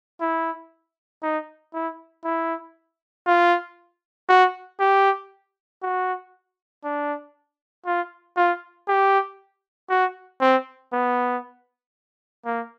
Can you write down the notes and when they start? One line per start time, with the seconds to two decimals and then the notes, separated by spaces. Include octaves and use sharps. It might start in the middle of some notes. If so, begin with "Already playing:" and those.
0.20 E4
1.23 D#4
1.74 E4
2.24 E4
3.27 F4
4.29 F#4
4.80 G4
5.82 F#4
6.84 D4
7.86 F4
8.37 F4
8.88 G4
9.90 F#4
10.41 C4
10.92 B3
12.45 A#3